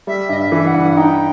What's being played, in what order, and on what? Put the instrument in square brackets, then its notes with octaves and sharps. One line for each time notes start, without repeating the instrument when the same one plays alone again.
[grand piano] G3 [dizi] E5
[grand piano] G2 [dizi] D#5
[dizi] E5
[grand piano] E3
[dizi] E5
F#5
[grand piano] G2
[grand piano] D#4 [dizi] G5